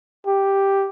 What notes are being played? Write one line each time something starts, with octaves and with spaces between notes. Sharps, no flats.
G4